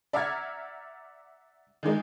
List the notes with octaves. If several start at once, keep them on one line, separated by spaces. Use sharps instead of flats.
D5 E5 F#5 A#5 F6 G#6
D#3 E3 G#3 D#4